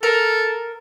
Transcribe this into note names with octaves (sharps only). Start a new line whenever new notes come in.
A4 A#4